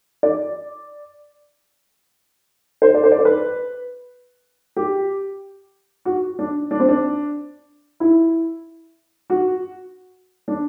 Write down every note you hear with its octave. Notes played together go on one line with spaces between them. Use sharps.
D5
C5
D5
C5
D5
C5
B4
G4
F#4
D4
D4
C4
D4
E4
F#4
D4